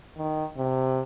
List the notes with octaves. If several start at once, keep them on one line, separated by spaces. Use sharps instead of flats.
D#3
C3